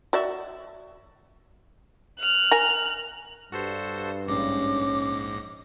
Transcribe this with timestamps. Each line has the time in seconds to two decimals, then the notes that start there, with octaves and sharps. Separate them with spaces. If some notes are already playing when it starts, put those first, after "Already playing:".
0.13 F#4 D5 E5
2.19 F6 F#6
2.51 A#4 G#5
3.52 G2 F#4 A4 C5
4.28 A#1 G#2 C#4 D6 A#6